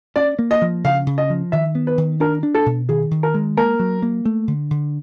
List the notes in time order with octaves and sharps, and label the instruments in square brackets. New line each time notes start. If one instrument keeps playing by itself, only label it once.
[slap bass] C#4 [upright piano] D5
[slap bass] A#3
[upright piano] D#5
[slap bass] F3
[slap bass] C#3 [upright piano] F5
[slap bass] C#3
[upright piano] D#5
[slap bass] F3
[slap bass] D#3 [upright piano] E5
[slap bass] B3
[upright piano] B4
[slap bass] D#3
[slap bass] D4 [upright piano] A#4
[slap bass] D4
[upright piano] A4
[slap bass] B2
[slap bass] D#3 [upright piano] G#4
[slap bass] D#3
[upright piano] A#4
[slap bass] G#3
[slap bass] A#3 [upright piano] A#4
[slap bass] F#3
A#3
A3
D3
D3